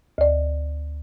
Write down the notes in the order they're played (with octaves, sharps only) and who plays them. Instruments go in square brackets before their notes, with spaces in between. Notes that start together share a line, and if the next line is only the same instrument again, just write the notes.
[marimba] D2 D5